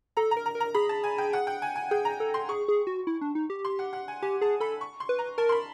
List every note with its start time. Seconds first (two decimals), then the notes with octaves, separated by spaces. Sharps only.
0.17 A4 A#5
0.31 A#5
0.37 A#4
0.46 A#5
0.55 A#4
0.60 A#5
0.75 G#4 B5
0.89 A5
1.04 G#5
1.18 G5
1.33 F#5
1.47 G5
1.62 G#5
1.76 G#5
1.91 G#4 G5
2.05 A#5
2.20 A4
2.34 C6
2.49 G#4 C#6
2.68 G#4
2.87 F#4
3.07 E4
3.21 D4
3.35 D#4
3.50 G4
3.65 C6
3.79 F#5
3.93 F#5
4.08 G#5
4.22 G4 G#5
4.41 G#4 A5
4.60 A4 B5
4.81 C#6
5.00 C6
5.09 B4
5.19 A#5
5.38 A#4 A5
5.49 C6
5.52 B5